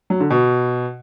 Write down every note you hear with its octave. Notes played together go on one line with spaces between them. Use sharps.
F#3
D3
B2